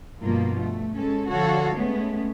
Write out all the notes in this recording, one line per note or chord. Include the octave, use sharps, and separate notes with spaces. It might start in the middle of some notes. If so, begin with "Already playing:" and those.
G2 B2 F3 A#3 F4
A3
G#3 C#4 A4
D3 F3 F#4 A4 C#5 F5
G#3 A3 B3 C#4